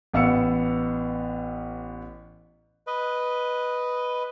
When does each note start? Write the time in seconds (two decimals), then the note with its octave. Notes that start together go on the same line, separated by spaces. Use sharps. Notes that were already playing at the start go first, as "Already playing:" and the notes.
0.13 A1 B3 F5 E6 C#7
2.87 B4 D#5